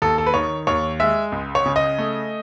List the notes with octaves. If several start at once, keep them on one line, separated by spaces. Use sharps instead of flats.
D#2 A4
A4
B4
D#3 C#5
D#2 C#5
G#3 E5
C#2
C#5
C#3
D#5
A3